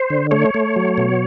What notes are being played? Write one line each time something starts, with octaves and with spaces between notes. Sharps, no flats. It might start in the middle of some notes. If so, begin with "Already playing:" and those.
Already playing: C5
D3
A3 C#5
A3
F#3
B2